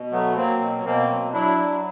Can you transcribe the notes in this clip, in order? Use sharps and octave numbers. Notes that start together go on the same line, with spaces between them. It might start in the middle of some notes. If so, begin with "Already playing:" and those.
Already playing: B2
F#3 A3 B3
F#3 A#3 C4
B2
B2 A#3 C4
F#3
F#3 D4 E4
F#3